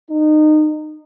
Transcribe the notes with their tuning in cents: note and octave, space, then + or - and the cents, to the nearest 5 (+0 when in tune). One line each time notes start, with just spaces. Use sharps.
D#4 -25